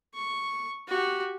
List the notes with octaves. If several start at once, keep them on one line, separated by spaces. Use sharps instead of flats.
C#6
F#4 G4